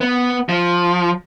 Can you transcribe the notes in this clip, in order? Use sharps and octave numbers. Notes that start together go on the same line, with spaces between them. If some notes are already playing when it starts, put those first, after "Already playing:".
B3
F3